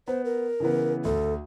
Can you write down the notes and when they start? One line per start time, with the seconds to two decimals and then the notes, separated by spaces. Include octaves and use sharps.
0.08 B3 C5
0.25 A#4
0.60 C#3 E3 B3
1.05 D2 A4